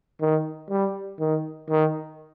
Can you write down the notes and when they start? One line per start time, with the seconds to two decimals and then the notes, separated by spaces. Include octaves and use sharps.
0.21 D#3
0.70 G3
1.20 D#3
1.70 D#3